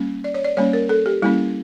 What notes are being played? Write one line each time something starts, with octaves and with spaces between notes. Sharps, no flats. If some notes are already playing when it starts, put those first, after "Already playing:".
Already playing: G3 A#3 C#4
D5
C#5
D5
G3 A#3 C#4 C#5
A#4
A4
G4
G3 A#3 C#4 E4